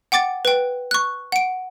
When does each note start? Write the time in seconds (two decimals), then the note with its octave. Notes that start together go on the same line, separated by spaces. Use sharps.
0.12 F#5 G5 D6 A6
0.45 B4 G5
0.91 C#6 F#6
1.32 F#5 D7